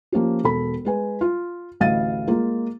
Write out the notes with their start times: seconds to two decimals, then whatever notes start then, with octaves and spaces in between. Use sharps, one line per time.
0.12 F3 A#3 C#4 G4
0.44 E1 A4 B5
0.85 G#3 B4 G#5
1.21 F4
1.80 A1 D2 D#5 F5 A6 D#7
2.28 G#3 A#3 F4 A#4